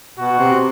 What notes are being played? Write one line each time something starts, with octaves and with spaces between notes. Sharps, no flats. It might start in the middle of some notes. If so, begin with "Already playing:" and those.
B2 F#4
C3